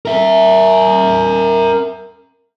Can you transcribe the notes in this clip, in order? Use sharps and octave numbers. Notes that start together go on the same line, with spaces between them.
A#4 E5